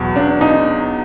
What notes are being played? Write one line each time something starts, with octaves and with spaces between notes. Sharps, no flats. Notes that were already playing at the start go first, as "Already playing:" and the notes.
Already playing: E2 B2 F#3
D4
D#4